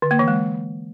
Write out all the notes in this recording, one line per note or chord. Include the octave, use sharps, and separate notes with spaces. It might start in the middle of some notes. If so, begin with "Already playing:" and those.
D3
A#3
E3
G#3